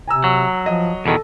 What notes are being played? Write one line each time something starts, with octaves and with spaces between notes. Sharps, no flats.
C3 G#5 A#5 E6
F#3
F3 D#5
E2 B2 D#3 A4